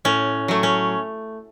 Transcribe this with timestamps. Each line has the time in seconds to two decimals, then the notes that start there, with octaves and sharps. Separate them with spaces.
0.05 A2 C#4
0.48 F#3 A3
0.63 C#4